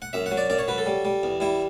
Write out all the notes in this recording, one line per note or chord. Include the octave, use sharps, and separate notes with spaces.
F#5
F#2 E5
F#5
F#3
D5
F#2 D5
C#5
F#3 B4
A4
G3
G3
E2
G3 E4